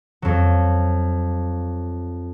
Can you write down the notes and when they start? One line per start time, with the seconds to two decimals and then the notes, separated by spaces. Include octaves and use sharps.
0.22 F2 F#3